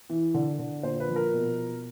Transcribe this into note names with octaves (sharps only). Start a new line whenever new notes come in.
E3
D3
D3
A#2 C5
B4
F3
A#4
B2